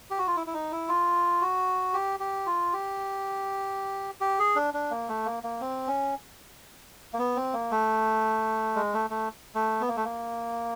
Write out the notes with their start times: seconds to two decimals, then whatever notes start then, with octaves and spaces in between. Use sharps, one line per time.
0.10 G4
0.18 F#4
0.27 F4
0.36 E4
0.47 E4
0.54 D#4
0.72 E4
0.89 F4
1.41 F#4
1.93 G4
2.20 G4
2.46 F4
2.73 G4
4.21 G4
4.39 G#4
4.56 D4
4.74 D4
4.91 A#3
5.09 A3
5.26 A#3
5.43 A#3
5.61 C4
5.87 C#4
7.14 A#3
7.19 B3
7.36 C4
7.54 A#3
7.71 A3
8.76 G#3
8.94 A3
9.10 A3
9.55 A3
9.81 B3
9.89 A#3
9.97 A3
10.05 A#3